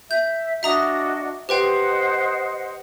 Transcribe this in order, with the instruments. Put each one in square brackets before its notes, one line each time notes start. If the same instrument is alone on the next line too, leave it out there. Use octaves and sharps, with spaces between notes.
[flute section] E5 [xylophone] G6
[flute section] D4 F#4 D#5 [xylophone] E5 A#5 D#6
[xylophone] G4 B4 G5 [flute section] C5 D#5 F#5